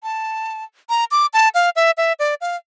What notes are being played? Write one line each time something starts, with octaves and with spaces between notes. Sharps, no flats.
A5
A#5
D6
A5
F5
E5
E5
D5
F5